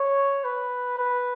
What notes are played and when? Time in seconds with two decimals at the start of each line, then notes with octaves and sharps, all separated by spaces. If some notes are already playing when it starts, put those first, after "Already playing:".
Already playing: C#5
0.44 B4
0.98 B4